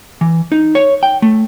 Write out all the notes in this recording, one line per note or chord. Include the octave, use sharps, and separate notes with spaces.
E3
D#4
C#5
G5
A3